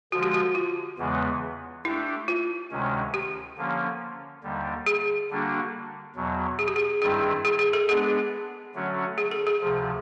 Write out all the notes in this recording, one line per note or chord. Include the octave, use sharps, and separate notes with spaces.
D3 F3 G#3 F#4
G4
F#4
F4
E2 C#3 E3 G#3 B3
A3 D4 E4 G4
F4
D2 C3 D#3 G#3 C#4
G4
D3 F3 A#3 C#4
D#2 D3 G3
G#4
D3 G3 A#3 D4 F#4
E2 B2 F#3
G#4
G4
G#4
G2 D#3 G3 C4 E4 G#4
G#4
G#4
A4
G#3 B3 D4 G#4
D3 F#3 A3 C#4 F#4
G#4
A4
G#4
D2 C3 F3